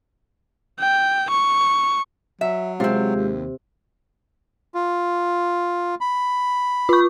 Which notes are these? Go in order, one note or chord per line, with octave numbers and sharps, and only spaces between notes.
G5
C#6
F#3 E5
C3 G#3 C4 F4
D#2
F4
B5
F4 C#6